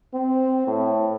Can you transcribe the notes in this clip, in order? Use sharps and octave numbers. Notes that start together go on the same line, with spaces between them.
C4
A2